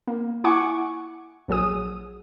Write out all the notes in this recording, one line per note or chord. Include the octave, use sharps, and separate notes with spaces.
A#3
E4 F#5 G#5 C#6 D6
A#1 F#3 G#4 D#6